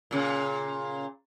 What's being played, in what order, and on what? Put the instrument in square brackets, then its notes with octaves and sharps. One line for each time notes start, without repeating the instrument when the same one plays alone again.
[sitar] A#2 C#3